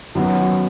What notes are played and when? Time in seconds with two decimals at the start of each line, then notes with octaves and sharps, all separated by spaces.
0.15 F#2 D#3 F#3 B3 F#4